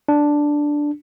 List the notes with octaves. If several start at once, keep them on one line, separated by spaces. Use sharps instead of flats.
D4